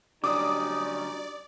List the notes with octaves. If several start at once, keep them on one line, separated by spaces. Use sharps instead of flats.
D3 F#3 G3 C#4 D#4 D5 D6 D#6